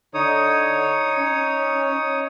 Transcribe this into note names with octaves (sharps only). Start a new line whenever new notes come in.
D3 D#4 C#5 D#6
C#4